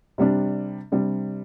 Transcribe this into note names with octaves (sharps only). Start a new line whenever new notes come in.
C3 G3 D4
C3 G3 D4